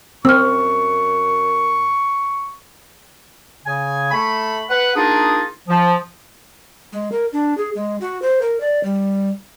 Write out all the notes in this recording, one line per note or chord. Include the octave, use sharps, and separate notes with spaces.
F#2 C4 C#6 E6 F6
C#3 G#5
A3 B5
B4 F#5
A#3 D4 D#4 F4 G#4
F3
G#3
A#4
D4
G#4
G#3
F#4
C5
A#4
D5
G3